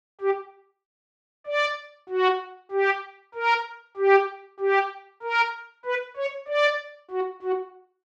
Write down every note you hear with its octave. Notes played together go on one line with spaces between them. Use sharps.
G4
D5
F#4
G4
A#4
G4
G4
A#4
B4
C#5
D5
F#4
F#4